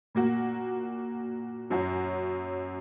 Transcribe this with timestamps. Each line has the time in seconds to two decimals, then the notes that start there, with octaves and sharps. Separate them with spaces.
0.15 A#2 A#3 F#4
1.70 F#2 F#3 C#4 F#4